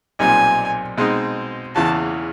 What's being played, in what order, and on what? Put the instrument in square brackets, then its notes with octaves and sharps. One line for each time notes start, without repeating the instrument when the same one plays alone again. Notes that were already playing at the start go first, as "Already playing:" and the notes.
[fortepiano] B1 A#2 G3 C4 D#4 [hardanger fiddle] G#5
[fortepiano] B2 G#3 C4 D#4
[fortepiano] E2 C#3 E3 [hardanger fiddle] A5